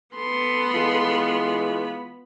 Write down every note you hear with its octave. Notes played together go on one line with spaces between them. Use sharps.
B3 A4 B5 C6
E3 G#3 F4